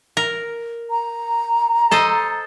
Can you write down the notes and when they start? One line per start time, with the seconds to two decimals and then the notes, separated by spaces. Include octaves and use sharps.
0.17 A#4
0.91 A#5
1.91 A4 C5 D#5